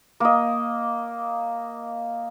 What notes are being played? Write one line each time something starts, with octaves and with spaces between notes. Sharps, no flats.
A#3 D#5